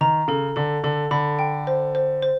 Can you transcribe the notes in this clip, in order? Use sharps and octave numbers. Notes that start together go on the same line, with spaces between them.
D#3 A#5
C#3 A4
D3 A4
D3 A4
D3 B5
G5
C5
C5
C5